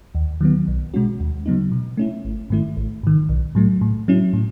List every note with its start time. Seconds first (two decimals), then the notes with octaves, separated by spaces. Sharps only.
0.15 D#2
0.41 D#3 F#3 B3
0.68 B1
0.94 B2 G#3 C#4 F#4
1.20 D#2
1.46 C#3 F#3 B3 D#4
1.72 B2
1.97 A3 C#4 E4
2.25 G#1
2.50 G#2 D#3 A3 E4
2.76 A1
3.03 G#2 D#3
3.29 B1
3.55 A2 F#3 A3
3.81 A2
4.08 F#3 C#4 E4
4.33 A2